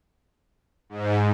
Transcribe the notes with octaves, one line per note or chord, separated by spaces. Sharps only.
G#2